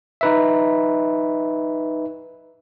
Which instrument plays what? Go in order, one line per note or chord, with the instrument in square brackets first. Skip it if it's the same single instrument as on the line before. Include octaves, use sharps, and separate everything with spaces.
[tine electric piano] D#4 B4 E5